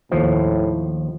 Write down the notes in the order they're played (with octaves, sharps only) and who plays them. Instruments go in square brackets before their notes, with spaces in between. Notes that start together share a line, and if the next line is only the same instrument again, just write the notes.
[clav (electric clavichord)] D#2 F3 [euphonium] A2